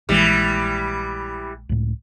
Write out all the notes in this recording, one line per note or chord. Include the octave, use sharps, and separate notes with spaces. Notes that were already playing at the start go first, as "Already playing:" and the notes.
A#1 E3 G3 G#3
C#2 A2